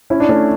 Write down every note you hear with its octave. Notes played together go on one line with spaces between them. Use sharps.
C#4 E4
D4
A3 C#4